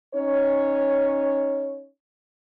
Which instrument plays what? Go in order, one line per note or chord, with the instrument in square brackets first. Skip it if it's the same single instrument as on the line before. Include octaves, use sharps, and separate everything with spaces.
[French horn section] C#4 D#4 C#5